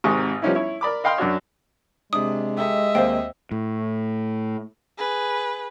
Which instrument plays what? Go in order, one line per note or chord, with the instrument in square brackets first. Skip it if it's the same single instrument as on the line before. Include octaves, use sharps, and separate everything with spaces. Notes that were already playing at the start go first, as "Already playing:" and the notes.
[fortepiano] G#1 G#2 C3 G4 C#6 D#6
F3 G3 B3 C#4 D#4 E4
E4 C#5
A#4 D5 B5 D6
D#5 F5 G5 B5 C6 F6
F#2 D4 F#4 C#5
[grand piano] C3 D4 [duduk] G#3 [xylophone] D#6
[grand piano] G4 A4 [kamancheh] D#5 E5
[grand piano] D#2 A#3 C4 [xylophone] C5 F5 G5
[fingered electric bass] A2
[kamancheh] G#4 B4